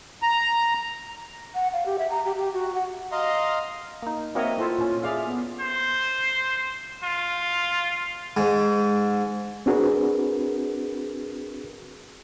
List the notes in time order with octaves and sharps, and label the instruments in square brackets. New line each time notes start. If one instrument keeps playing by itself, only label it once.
[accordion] A#5
[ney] F#5
F5
G4
E5
A#5
G4
G4
F#4
F#5
[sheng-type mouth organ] D#5 F5 A#5 C6
[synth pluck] A#3 D#4
[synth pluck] A#3 C4 A#4 [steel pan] F#4 C#5 D#5 [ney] E5
[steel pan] E4 A4 C5 [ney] F4
[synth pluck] A#2 C#4
[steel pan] G#4 D5 F5 [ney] E5
[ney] B3
[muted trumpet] C5
F4
[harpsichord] G#2
[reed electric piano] C4 D4 F#4 G#4 A#4 B4